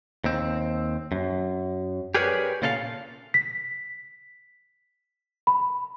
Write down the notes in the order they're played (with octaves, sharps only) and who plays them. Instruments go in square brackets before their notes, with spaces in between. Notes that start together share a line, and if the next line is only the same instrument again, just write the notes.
[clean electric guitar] D#2 C4
F#2
G4 G#4 A#4 B4 C#5 D5
A#2 C#3 F4 A4 D#5 F5
[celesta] B6
B5